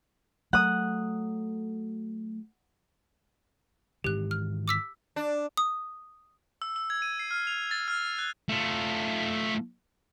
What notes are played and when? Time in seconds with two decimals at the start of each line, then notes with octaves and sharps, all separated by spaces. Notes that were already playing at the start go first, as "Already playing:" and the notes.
0.53 F#3 A3 F#5 D#6
4.04 G#2 D#3 E3 G4 F#6
4.31 F6
4.68 D6 E6 B6
5.16 D4
5.57 D#6
6.62 E6
6.76 E6
6.90 G#6
7.02 D#7
7.19 C7
7.31 F6
7.47 F7
7.71 A6
7.88 F6
8.19 F#6
8.49 A3 F4